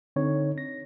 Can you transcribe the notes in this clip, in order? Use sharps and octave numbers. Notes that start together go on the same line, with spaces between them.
D3 C4 D#4 C#5
A#6